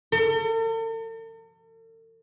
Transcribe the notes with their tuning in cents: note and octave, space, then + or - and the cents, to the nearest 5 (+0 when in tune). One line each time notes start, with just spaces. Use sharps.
A4 +45